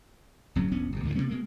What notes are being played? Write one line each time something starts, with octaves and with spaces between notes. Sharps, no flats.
D1 F#2 F#3 C#4
E1 A#1 B3 C#4
G1 B2
D2 G#2 D3 E3
C3 F#3 A#3 C#4
B2 G#3 A#3